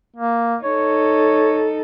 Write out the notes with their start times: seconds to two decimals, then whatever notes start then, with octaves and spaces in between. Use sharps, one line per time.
0.16 A#3
0.63 D#4 A4 C#5